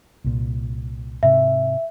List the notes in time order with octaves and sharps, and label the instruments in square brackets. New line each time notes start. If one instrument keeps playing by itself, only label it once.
[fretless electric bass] C2 A#2
[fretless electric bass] G#2 C3 [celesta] E5